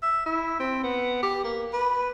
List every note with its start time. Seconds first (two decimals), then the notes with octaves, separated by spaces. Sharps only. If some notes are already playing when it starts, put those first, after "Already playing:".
0.03 E5
0.26 E4
0.60 C4
0.83 B3
1.23 G4
1.44 A#3
1.73 B4